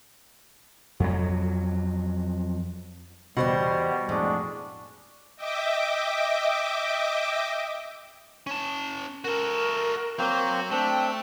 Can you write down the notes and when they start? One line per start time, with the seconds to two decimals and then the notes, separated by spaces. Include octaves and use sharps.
1.00 F2 F#3
3.37 E2 B2 G3 C5 F#5
4.09 F2 A2 G#3 D4 C#6
5.36 D#5 E5 G5 D6
8.47 C#4 A5
9.25 F#4 A4 A#4
10.19 F#3 A#3 C4 C5
10.71 A3 C4 D4 G5